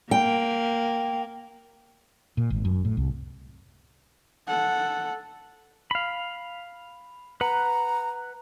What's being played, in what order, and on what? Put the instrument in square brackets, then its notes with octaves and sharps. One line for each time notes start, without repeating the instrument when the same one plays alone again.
[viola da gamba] A#3 [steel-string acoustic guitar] G5
[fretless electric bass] A#2
G#1
F#2
A2
C2
[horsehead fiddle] A4 F#5
[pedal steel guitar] F5 B5
[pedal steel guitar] B4 F#5 [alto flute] A#5